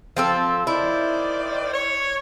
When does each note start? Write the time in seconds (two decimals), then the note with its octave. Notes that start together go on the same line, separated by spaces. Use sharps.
0.17 F3 C4 A4
0.67 D#3 E4 C5 D5
1.72 C#5